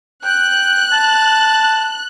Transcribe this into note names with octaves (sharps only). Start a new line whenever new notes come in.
G5 F#6
A5